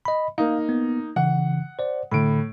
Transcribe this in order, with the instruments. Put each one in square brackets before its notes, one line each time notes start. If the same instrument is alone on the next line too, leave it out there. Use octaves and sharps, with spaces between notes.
[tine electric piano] D#5 B5
[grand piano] A#3 D#4 [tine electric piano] F5
[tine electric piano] B3
[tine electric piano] C#3 E3 [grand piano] F#5
[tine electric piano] C5 D5
[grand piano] A2 D7 [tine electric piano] D3 B5